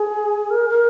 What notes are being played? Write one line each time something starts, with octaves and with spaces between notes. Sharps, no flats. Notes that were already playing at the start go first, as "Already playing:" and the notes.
Already playing: G#4
A#4
A#4